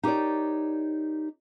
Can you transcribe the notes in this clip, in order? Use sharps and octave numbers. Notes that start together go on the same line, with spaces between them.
D#4 G4 A#4 C#5 D5